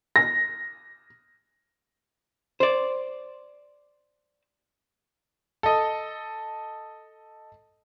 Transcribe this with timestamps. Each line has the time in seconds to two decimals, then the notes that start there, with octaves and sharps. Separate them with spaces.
0.16 A#6
2.60 C5 D5
5.63 A4 D#5